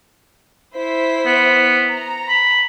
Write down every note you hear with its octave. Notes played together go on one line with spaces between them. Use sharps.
E4 C5 B6
B3
A#5
B5